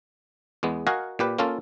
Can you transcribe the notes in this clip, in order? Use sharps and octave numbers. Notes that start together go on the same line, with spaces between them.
E2 G#3 B3
F#4 A#4 D#5 F5 F#5 G#5
A#2 G4 B4
A#3 C#4 F4 A4